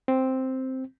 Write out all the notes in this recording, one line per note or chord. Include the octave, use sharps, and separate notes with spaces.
C4